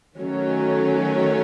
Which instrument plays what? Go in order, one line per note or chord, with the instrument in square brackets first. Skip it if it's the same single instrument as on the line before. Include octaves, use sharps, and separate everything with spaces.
[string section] D#3 F#3 A3 C#4